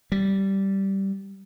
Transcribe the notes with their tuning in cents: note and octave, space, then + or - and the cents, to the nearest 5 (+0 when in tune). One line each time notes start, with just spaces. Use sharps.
G3 -10